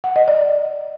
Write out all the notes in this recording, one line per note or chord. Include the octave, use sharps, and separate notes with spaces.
F#5
D#5
D5